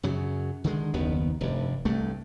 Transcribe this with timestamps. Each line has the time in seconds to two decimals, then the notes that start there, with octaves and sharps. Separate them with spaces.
0.03 F#2 C#3 F#3
0.64 D3 D#3 G#3
0.94 F#1 D#2 D#3 B3
1.41 F1 G2
1.85 C2 G2 A3